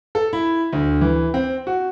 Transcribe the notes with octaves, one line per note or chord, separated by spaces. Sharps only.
A4
E4
D2
E3
C4
F#4